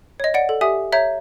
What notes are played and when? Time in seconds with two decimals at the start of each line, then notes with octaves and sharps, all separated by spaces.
0.20 C#5 D#5
0.34 D5 F#5 D7
0.49 A4
0.61 G4 E5 G#5 D#6
0.92 C#5 E5 A#5 G6